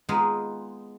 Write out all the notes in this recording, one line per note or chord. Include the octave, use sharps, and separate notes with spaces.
G#3 B3 D#4 F4 G#4